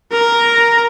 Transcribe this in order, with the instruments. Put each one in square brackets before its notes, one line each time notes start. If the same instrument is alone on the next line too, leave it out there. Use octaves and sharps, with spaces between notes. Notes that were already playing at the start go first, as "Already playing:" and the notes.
[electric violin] A#4 A#5